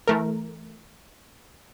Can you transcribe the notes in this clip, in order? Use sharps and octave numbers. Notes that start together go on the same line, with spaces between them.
E3 A3 A#4